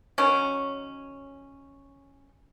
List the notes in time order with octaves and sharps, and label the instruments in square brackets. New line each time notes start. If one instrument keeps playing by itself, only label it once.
[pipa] D#3 F#3 C#4